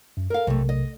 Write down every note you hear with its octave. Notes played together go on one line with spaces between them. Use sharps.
F#2
A4 A#4 F5
B1 F2 C3 A3 A#4
D#5